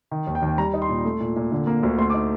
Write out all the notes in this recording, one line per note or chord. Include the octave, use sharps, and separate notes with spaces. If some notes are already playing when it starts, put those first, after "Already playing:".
D#3
D#2
G5
D#2
G3 A#5
D#4
C6
A#2
A3
A#2
A#2
D3
A#3
D2
A3 C6
D6
D#4